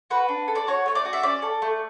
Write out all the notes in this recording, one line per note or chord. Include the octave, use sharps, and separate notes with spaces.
F#4 B4
D4
A4
D5
F#4 C#5
A3 C#5
D5
F#4
E5
C#4 D5
A4
A3